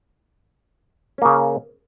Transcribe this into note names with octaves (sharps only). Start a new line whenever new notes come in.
C#3 A#3 C#4